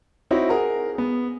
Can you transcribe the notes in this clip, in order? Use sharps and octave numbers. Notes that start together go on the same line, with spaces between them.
C4 D#4 E4 F#4 C#5
G#4 A#4 F#5 A#5
B3 G#4